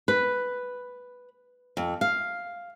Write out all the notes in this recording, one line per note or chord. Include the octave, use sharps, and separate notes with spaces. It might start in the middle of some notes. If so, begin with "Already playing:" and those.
B4
F2
F5